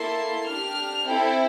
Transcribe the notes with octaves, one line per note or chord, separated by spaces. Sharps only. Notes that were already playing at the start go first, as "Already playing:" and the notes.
Already playing: A#3 E4 A4 C6
D4 G4 F6
C4 E4 A4 G5